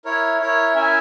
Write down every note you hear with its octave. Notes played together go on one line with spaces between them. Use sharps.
E4 A#4 C#5
E4 A#4 C#5
C#4 E4 A#4 E5 G#5